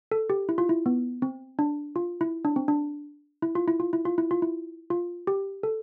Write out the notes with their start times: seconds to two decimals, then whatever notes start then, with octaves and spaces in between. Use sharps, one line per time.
0.12 A4
0.30 G4
0.49 E4
0.58 F4
0.69 E4
0.86 B3
1.22 C4
1.59 D4
1.96 F4
2.21 E4
2.45 D4
2.56 C4
2.68 D4
3.42 E4
3.55 F4
3.68 E4
3.80 F4
3.93 E4
4.05 F4
4.18 E4
4.31 F4
4.42 E4
4.90 F4
5.27 G4
5.63 A4